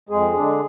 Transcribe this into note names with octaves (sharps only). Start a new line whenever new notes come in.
F2 G#3 G#4
D3 G#3 D4